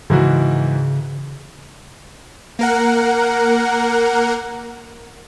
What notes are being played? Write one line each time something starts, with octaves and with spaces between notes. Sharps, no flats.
G#2 C#3 E3 F#4
A#3 A#4 F#5